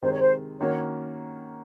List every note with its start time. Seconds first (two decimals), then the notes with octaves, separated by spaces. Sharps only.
0.02 C3 D#3 G#3 C5
0.11 C#5
0.20 C5
0.60 D#3 A#3 C#4 F#4 C#5